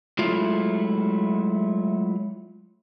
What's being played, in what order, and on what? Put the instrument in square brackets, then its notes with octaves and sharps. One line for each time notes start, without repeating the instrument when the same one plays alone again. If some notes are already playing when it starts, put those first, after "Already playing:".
[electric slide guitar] F#3 G#3 A3 E4 F4